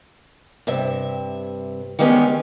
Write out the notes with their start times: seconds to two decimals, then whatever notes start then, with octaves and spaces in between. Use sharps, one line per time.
0.67 G2 C3 E5
1.99 D#3 G3 G#3 A#3 B3 C#4